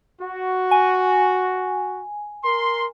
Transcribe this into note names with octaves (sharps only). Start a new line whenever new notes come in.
F#4
G#5
A#4 C6